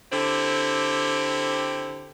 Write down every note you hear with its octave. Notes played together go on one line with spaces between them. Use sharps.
D3 C4 E4 G4